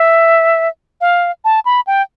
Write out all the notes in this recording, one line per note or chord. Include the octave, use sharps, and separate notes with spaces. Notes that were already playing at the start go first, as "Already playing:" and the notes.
Already playing: E5
F5
A5
B5
G5